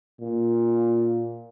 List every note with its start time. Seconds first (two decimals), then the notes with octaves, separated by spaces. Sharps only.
0.21 A#2